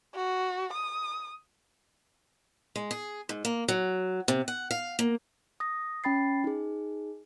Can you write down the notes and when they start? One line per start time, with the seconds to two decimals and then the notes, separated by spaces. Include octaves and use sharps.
0.15 F#4
0.73 D#6
2.76 G#3
2.91 G#4
3.29 G#2
3.45 A#3
3.68 F#3
4.28 C3
4.48 F#5
4.71 F5
4.99 A#3
5.60 D#6 A#6
6.04 C#4 G5 B5 A6 C7
6.44 D#4 G#4